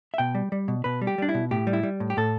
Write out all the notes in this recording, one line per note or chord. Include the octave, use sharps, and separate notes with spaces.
E5
B2 G5
G3
G3
B2
B2 B4
G3
G4
G3 D4
E4
B2
A2 G4
G3
E4
G3
A2
G4
A2 A4